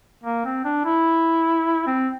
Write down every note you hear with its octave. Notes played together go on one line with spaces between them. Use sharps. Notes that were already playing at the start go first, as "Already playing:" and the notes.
A#3
C4
D4
E4
C4